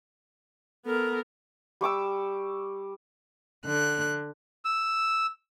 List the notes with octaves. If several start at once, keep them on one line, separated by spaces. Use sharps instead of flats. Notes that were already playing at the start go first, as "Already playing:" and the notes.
B3 A4 A#4
G3 C#6 D6 E6
D3 F#6
E6